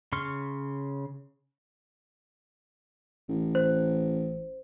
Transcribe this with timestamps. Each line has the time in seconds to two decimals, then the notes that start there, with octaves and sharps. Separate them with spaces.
0.12 C#3 C6 C#6 F6
3.29 A1
3.55 C5